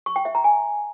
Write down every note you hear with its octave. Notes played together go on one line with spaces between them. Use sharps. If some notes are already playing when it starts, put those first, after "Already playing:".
C#6
G5
E5
A#5
G#5